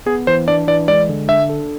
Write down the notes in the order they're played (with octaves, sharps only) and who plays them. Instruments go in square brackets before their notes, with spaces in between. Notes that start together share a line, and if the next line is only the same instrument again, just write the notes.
[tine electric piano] B3 [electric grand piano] G#4
[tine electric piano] E3 [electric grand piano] C5
[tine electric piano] D4 [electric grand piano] D5
[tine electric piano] E3 [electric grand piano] D5
[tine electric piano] G#3 [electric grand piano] D5
[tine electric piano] D3
[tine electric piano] D4 [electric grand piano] E5
[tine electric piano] A4